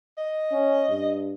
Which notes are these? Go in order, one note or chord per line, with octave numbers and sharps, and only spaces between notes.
D#5
C#4
G2